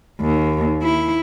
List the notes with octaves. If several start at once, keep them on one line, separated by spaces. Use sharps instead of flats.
D#2
E4